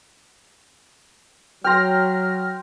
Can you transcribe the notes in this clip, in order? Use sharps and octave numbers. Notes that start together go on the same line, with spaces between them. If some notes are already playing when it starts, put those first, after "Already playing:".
F#3 G5 C6 F6 A#6